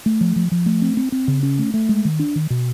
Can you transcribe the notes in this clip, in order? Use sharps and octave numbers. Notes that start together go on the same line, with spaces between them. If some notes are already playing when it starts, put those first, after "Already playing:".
A3
F3
F3
F3
A3
C4
C4
C4
C#3
C#4
A3
A3
G#3
D#3
D4
D#3
B2